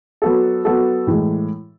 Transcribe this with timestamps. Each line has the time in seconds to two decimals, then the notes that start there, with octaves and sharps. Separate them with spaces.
0.22 F#3 B3 F#4 A4
0.65 F#3 B3 F#4 A4
1.07 A2 E3 G#3